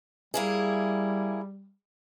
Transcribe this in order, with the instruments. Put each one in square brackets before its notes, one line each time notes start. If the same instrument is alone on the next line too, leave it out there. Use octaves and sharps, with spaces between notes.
[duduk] G3 [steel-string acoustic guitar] A#3 E4 G#4